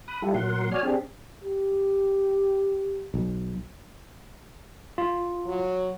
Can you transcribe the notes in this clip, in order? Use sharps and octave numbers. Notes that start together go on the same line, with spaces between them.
B5 D#6 F#6
G3 E4 F4 G4 A4
A#2 F#3 A#4 F#5 C6
F#4 C#5 D5 G#5 F6
C4 D4 G4 G#4
G4
B1
F4
F#3